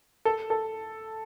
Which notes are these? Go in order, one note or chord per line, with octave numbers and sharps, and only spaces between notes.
A4
A4